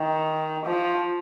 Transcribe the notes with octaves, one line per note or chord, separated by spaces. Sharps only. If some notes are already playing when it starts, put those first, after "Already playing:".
Already playing: D#3
F3